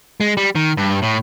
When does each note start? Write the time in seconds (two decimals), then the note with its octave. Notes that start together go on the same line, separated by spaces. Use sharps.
0.21 G#3
0.37 G3
0.55 D#3
0.77 G2
1.02 A2